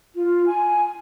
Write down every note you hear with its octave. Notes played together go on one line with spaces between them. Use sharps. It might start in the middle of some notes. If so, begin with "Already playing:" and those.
F4
G#5